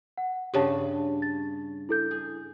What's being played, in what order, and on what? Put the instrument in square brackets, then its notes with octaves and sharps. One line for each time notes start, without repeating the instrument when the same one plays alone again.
[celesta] F#5
[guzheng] G2 C#3 [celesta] G4 C#5 A5
[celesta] A6
E4 A4 G6
[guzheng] G#4